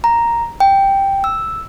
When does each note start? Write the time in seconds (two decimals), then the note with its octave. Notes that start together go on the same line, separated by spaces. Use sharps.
0.04 A#5
0.60 G5
1.24 E6